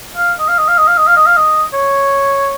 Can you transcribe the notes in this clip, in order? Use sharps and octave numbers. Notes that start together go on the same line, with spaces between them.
F5
D#5
F5
D#5
F5
D#5
F5
D#5
F5
D#5
F5
D#5
C#5